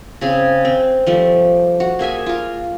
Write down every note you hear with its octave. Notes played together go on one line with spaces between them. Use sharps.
C#3 C4 G#4
C4
F3 G3 A3
F#4
A#3 G#4 E5 G#5
F4 A#4